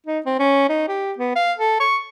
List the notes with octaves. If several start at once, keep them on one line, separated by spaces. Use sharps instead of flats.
D#4
C4
C#4
D#4
G4
B3
F5
A4
C#6